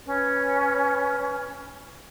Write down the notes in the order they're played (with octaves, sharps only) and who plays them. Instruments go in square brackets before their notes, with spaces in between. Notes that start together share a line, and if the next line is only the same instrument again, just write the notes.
[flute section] C#4 B4